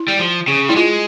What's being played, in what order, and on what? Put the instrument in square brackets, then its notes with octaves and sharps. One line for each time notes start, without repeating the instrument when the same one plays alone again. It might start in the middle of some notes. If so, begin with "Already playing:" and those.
Already playing: [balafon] E4
[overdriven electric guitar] G3
F3
C#3
[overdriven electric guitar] G3 [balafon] E4
[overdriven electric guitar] G#3 [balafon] F4